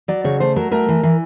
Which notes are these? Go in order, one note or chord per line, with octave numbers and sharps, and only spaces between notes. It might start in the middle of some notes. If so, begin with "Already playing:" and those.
F#3 D5
C#3 C#5
A3 C5
F#3 A#4
A3 A#4
E3
E3